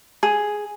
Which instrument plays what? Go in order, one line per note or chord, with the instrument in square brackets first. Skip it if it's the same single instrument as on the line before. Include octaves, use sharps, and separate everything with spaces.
[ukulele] G#4